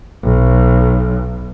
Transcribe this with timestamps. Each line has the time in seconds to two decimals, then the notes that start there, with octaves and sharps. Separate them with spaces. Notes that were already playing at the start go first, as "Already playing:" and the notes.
0.24 B1